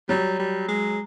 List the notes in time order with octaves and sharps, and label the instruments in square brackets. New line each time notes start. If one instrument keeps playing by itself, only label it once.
[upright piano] F#3 [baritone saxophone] G3
[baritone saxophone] G3
G#3